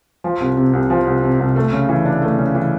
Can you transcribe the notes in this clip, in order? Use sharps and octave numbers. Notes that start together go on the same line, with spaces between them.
F3
C2
C3
C2
F3
C2
C3
C2
A3
C#3
E3
D4
A3
C#3
E3